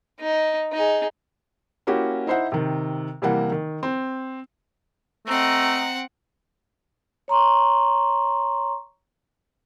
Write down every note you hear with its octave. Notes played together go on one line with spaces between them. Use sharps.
D#4
D#4 G#4
A#3 C#4 E4 F#4 G4
D#4 E4 C5 E5 F#5
C3 D#3
C3 E3 G3 A#3 F#5
D#3
C4
A3 C4 D#5 F#5 A#5
C#5 A#5 C6 C#6